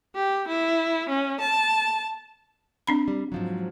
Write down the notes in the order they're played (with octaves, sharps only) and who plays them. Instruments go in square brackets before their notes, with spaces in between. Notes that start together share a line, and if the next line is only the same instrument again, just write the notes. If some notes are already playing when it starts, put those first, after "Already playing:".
[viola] G4
E4
C#4
A5
[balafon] C4 D4 B5
[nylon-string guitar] G3
G#2 F3 F#3